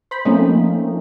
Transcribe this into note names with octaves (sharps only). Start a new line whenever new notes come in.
C5 B5
F3 A3 A#3 C4 C#4 D#4